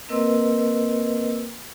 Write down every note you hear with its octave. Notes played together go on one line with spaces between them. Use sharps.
A#3 C4 A#4 B4 D#5 E6